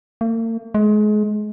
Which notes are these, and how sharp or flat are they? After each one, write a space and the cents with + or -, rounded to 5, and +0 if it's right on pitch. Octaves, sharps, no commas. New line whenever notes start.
A#3 -45
G#3 +30